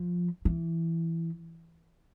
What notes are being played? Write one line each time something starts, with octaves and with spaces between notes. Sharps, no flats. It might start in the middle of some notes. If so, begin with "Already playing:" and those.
Already playing: F3
E3